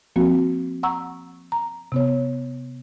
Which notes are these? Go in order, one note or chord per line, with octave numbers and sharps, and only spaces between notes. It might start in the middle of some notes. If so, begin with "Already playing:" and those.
F3 A#3 C4 F#4
F#5 A#5 C#6 E6
A#5
C3 B3 C#5